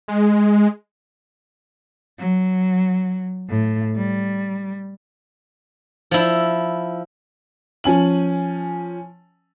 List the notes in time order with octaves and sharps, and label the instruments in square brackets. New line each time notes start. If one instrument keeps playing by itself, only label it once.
[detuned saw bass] G#3
[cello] F#3
A2
G3
[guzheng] F3 E4
[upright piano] F3 C#4 G#5 F#7